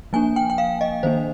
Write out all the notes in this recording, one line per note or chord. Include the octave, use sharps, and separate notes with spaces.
F3 A#3 D4 G#5
G5
G5
F5
D#5
D#3 A#3 D4 C5